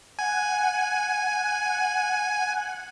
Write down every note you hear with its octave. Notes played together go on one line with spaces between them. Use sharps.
F#5 G#5